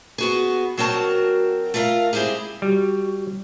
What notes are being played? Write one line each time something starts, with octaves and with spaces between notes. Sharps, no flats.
B3 F#4 G#4
F#3 C4 F#4 A#4 A5
A3 F4 A#4 F5
G#3 C4 E4 G4 G#4
G3 F#4